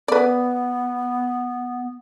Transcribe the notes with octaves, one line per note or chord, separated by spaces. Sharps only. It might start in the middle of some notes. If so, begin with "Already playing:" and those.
B3 B4 D5